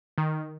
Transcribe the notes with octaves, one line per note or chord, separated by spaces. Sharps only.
D#3